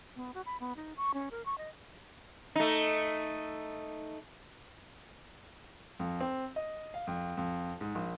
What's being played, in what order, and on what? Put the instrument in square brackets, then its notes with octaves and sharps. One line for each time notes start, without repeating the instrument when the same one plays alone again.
[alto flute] B3
F#4
B5
B3
D#4
C#6
C#4
A#4
C#6
D#5
[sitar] A3 D#4
[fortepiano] F2
C4
D#5
F5
F2
F2
G#2
A#1